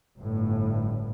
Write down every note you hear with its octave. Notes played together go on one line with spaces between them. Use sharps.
G1 A2